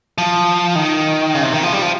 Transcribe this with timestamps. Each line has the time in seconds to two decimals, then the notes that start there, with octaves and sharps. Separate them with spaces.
0.18 F3
0.75 D#3
1.34 C#3
1.43 C3
1.53 D#3
1.63 F3
1.72 G3
1.82 F3